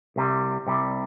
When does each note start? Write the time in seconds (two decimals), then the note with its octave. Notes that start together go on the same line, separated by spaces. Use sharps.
0.16 C2 C3 G3
0.67 C2 C3 G3